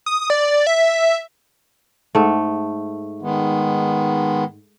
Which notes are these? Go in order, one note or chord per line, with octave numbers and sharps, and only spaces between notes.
D#6
D5
E5
G#2 A3
D#3 G#3 B3